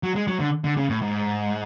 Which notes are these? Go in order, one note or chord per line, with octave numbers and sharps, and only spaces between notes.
F#3
G#3
F#3
D3
D3
C#3
A2
G#2